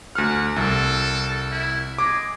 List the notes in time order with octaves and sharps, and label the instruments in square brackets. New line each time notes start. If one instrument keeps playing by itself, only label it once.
[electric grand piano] D2 F6 [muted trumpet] F#5
[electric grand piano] C2 [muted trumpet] A4
[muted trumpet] E4
[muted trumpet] G#3 [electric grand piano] D6